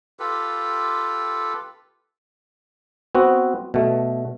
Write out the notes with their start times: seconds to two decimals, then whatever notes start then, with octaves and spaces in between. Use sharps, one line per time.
0.19 F4 G4 A4 B4
3.15 B3 C4 F#4
3.74 B2 A3